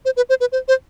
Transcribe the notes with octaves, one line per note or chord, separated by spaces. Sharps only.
C5
B4
C5
B4
C5
C5